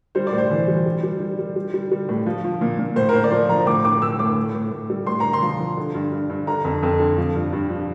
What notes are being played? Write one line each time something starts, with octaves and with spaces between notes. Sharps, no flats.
G3 C5
D5
A2
C5
E3
G3
G3
G3
G3
G3
G3
G3
G3
A2
F3
F3
A#2
A#2
A2 C5
A#4
A2 C5
D5
F3 C5
F3 A#5
A2 D6
A2 D6
A2 E6
A2 D6
A2
A2
A2
G3
A2 C6
A2 A#5
C6
F3
F3
D3
G2
G2
G2
D3 A#5
F2
F2
D3
F3
G2
G2
F3